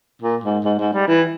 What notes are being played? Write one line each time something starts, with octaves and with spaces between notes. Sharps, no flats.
A#2
G#2
G#2
G#2
G3
E3